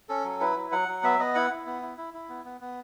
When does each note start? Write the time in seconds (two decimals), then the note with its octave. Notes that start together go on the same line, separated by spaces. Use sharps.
0.09 C#4 A4
0.24 F#3
0.41 E4 B4
0.56 F#3
0.72 F#3 F#5
0.88 F#3
1.03 B3 E5
1.19 B3 D#5
1.35 E4 F#5
1.50 E4
1.66 B3
1.82 E4
1.98 E4
2.14 E4
2.29 B3
2.45 B3
2.61 B3